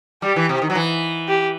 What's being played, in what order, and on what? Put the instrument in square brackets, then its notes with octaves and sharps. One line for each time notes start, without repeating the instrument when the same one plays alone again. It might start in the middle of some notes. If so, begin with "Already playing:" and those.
[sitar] G3 [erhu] G4
[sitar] E3
C3
D#3
F#3
E3
[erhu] G4